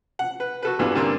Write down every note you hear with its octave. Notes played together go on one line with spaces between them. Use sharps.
F#5
B4
F#4 A4 B4
E2 G2 E3 B3 F4
G2 D3 E3 A#3 C4